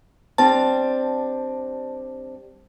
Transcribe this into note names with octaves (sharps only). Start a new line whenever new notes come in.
G3 C4 D4 A5